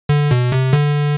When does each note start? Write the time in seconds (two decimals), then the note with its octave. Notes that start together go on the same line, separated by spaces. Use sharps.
0.09 D3
0.31 B2
0.52 C3
0.73 D3